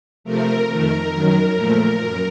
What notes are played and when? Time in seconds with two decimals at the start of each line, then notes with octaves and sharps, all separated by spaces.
0.24 C3 F3 A3 A#4
0.68 F2 D#3 A3 A#4
1.12 F#2 D#3 F#3
1.56 A#2 F3 A3
1.99 F#2